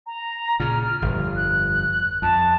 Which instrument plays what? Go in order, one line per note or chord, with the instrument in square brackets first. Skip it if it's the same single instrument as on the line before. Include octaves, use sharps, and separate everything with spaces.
[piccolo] A#5
[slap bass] A#2 C#3 [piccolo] F6
[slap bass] G1 F2
[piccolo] F#6
[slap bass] F2 [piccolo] A5